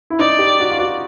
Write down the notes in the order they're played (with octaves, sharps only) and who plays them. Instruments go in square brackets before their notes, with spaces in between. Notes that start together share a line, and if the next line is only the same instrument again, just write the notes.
[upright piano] E4
[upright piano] D#4 [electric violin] D5
[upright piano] G4
F#4
F4
F#4